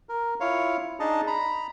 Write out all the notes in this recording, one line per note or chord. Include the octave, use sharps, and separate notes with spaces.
A#4
E4 F4 C#5 F5
D4 D#4 G#4 D#5 A5
A#5 B5